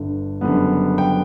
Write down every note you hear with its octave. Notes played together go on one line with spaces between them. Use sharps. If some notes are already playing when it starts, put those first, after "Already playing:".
Already playing: G1 G2 D3
F#1 F#2 D3 G3 B3
G5